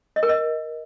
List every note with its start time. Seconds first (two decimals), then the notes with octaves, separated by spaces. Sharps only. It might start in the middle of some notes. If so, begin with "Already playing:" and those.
0.16 D#5
0.23 A#4
0.29 D#5